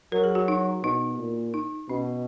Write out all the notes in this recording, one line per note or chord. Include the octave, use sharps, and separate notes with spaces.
F#3 A#4
G#4
F#4
D#4
B2 D#4
A#2
D#4
B2 C#4